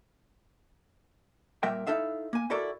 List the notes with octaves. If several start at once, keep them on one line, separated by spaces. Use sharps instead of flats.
A#2 G3 A#4 E5 G5
D#4 E4 A4 E5 F5
A#3 G#5
E4 F#4 A4 A#4 D5